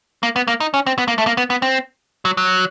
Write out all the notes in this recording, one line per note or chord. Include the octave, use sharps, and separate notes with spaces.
A#3
B3
A#3
D#4
C#4
C4
B3
A#3
A3
A#3
B3
B3
C4
F#3
F#3